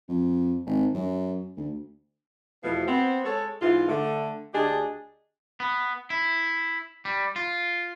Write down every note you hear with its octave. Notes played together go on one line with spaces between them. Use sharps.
F2
G#1
F#2
D2
E2 B2 E3 F3 A3
B3 C4
G#3 A4 C#5
G#2 E3 F4
D3 A3
D2 D4 G4 G#4 D#5
B3
E4
G3
F4